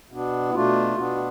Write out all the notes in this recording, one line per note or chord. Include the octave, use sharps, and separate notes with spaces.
B2 B3 D4
E4
B2 A3 D4 F4
B2 B3 D4